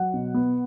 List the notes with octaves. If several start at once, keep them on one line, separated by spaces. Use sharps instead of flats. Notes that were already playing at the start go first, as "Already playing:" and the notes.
Already playing: F#3 F#5
B2
B3